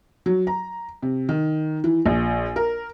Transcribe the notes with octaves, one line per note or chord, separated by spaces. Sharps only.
F#3
A#5
C3
D#3
E3
A#1
A#4